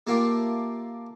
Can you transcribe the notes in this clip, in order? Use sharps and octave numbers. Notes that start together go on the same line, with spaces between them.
A3 A#3 F4 G4